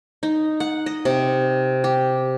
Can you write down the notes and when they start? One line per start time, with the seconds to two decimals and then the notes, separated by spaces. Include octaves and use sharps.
0.23 D#4
0.60 F#5
0.86 D#5
1.05 C3
1.84 G4